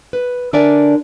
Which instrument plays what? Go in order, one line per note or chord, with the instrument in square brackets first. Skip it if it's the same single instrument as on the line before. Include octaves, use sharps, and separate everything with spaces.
[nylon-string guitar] B4
D3 D4 A#4 D5 E5 G#5